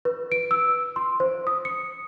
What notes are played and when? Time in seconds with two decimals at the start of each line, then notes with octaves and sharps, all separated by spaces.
0.05 B4
0.32 D7
0.51 E6
0.96 C6
1.20 C5
1.47 D#6
1.65 C#7